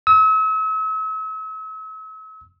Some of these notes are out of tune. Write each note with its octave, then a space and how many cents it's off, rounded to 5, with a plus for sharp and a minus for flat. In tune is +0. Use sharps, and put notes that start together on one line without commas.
E6 -40